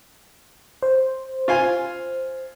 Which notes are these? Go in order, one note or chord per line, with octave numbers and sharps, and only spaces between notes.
C5
F4 F5 G#5